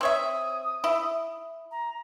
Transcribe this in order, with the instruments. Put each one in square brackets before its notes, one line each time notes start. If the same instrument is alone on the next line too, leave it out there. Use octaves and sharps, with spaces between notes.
[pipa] C4 C#5 E5 [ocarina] D#6
[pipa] E4
[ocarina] A#5